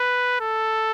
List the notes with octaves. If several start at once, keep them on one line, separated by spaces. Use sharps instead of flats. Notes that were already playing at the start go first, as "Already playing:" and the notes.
Already playing: B4
A4